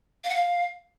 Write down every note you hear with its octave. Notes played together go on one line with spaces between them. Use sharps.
F5
F#5
F5